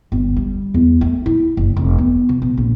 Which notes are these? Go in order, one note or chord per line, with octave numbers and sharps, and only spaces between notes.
G1
G3
E2
A3
E4
F#1
F1
B3
B2
B2
A#1